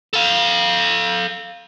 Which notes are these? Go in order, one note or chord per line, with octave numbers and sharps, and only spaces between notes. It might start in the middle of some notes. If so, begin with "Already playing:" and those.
A4 F5